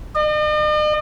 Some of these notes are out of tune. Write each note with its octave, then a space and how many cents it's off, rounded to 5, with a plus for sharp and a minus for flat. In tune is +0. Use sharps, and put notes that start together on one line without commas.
D#5 -45